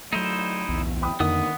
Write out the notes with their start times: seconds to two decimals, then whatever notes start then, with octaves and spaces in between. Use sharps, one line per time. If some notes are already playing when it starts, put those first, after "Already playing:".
0.13 F#3 A3 D#4 E4 C5
0.69 D1 B1 E2
1.02 G5 B5 D#6
1.20 F2 D3 D#3 A#3 B3 F#5 D#6